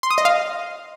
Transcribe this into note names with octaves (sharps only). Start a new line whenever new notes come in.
C6
D#6
D#5
F5